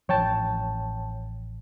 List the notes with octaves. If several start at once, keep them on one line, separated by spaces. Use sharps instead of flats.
A1 F3 C#5 G5 A5